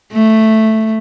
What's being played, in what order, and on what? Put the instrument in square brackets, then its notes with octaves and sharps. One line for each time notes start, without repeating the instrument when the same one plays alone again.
[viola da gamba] A3